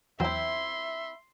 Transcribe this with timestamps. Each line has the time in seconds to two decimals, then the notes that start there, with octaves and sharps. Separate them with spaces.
0.20 E2 F#3 C4 E4 E5 C6